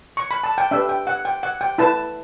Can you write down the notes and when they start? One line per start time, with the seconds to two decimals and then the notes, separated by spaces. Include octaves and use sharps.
0.17 C#6
0.31 B5
0.44 A5
0.58 G5
0.71 D4 G4 B4 E5
0.89 G5
1.07 F#5
1.25 G5
1.43 F#5
1.61 G5
1.78 E4 B4 A5